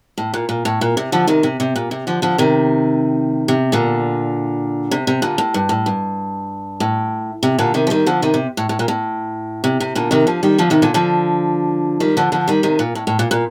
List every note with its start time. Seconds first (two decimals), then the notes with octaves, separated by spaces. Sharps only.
0.18 A2
0.34 A#2
0.49 A#2
0.65 A2
0.81 A#2
0.97 C3
1.12 D3 F3
1.27 C3 D#3
1.43 C3
1.60 C3
1.76 A#2
1.91 C3
2.07 D3 F3
2.22 D3 F3
2.38 C3 D#3
3.48 C3
3.72 A#2 D3
4.91 C3
5.07 C3
5.22 A#2 D3
5.38 A2
5.54 G2
5.69 A2
5.86 G2
6.80 A2
7.43 C3
7.59 A#2 D3
7.74 C3 D#3
7.87 F3
7.90 D#3 G3
8.06 D3 F3
8.22 C3 D#3
8.34 C3
8.57 A2
8.69 A2
8.79 A#2
8.88 A2
9.64 C3
9.80 C3
9.95 A#2 D3
10.11 C3 D#3
10.27 D3 F3
10.43 D#3 G3
10.58 D3 F3
10.70 C3 D#3
10.82 A#2 D3
10.94 D3 F3
12.00 D#3 G3
12.17 D3 F3
12.32 D3 F3
12.48 D#3 G3
12.63 C3 D#3
12.79 A#2
12.95 A2
13.07 A2
13.19 A#2
13.31 A#2